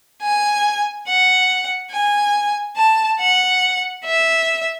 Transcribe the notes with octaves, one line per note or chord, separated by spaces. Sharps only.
G#5
F#5
G#5
A5
F#5
E5